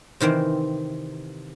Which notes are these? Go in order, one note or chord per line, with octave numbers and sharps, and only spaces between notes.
C3 D#3 E3 C4